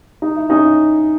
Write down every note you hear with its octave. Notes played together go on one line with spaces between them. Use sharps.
D#4
E4
C#4 D#4